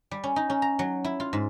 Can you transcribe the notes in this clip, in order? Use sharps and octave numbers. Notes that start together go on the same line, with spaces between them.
G3
C#4
D#4
C#4
A#5
F#3
E4
F4
G#2